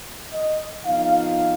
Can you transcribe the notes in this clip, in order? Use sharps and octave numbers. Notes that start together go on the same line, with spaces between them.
D#5
F2 F3 B3 D#4 F5